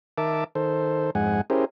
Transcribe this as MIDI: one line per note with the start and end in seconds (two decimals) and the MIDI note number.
0.18 0.44 51
0.18 0.44 70
0.18 0.44 76
0.18 0.44 81
0.18 0.44 86
0.55 1.10 51
0.55 1.10 69
0.55 1.10 72
1.15 1.41 41
1.15 1.41 44
1.15 1.41 56
1.15 1.41 78
1.15 1.41 80
1.50 1.65 61
1.50 1.65 64
1.50 1.65 67
1.50 1.65 68
1.50 1.65 70
1.50 1.65 72